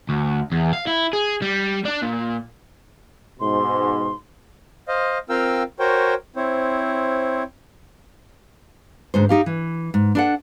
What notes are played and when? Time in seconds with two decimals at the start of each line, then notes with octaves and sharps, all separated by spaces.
0.09 D2
0.52 E2
0.73 F5
0.87 E4
1.13 G#4
1.42 G3
1.85 D4
2.02 A#2
3.40 G#2 B2 C6
4.87 C5 D#5 F5
5.30 C4 F4 A#4 F5 G5 E6
5.79 F#4 A#4 C5 C#5 G5
6.36 C4 E4 C5 C#5
9.14 D2 G#2 C5
9.29 D#4 G4 F5
9.46 E3
9.94 G#2
10.15 D4 A4 F#5